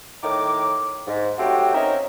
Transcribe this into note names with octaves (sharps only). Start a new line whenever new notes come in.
A2 D#3 A#4 D6
G#2
F#3 A3 C4 F#4 G4
C4 C#4 D#4 A#4 D#5 E5